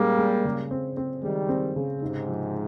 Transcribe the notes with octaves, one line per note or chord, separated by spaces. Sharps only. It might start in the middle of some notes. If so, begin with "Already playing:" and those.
Already playing: A#2 G3 G#3 A#3 C#4
G#3
C#3
C4
C4
D#3 G3 G#3
C4
C#3
G#2 C3 D#4
F3